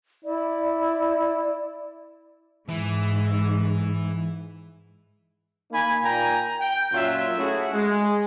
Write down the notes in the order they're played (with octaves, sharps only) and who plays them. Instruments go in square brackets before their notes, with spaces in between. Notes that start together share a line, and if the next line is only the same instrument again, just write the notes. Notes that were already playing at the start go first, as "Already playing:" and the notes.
[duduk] E4 [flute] D5
[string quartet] G#2 [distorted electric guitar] E3
[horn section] A#3 D#4 G#5 B5
A#2 A#3 G5 G#5 A#5
G5
F#2 A#2 F#3 F4 E5
A3 C#4 E4 F#4 G#4
G#3